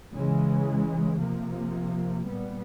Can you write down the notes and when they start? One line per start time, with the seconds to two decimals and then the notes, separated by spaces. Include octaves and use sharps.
0.13 C#3 E3 G#3
1.19 C3 F3 A#3
2.26 A#2 G3 B3